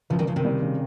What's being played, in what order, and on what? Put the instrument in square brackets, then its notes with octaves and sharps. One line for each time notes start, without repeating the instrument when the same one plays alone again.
[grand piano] C#2 [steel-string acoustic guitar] C#3 F3
[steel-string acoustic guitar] D#3 G3
[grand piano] C#2 [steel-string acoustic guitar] C#3 F3
[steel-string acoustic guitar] C3 D#3
[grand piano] G3
C#3